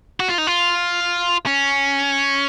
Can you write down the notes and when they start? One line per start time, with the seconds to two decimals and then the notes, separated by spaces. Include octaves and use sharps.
0.20 F#4
0.29 F4
0.38 D#4
0.47 F4
1.46 C#4